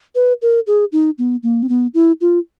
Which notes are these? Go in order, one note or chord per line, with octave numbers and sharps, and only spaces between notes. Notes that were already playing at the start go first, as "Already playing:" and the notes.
B4
A#4
G#4
D#4
B3
A#3
C4
B3
E4
F4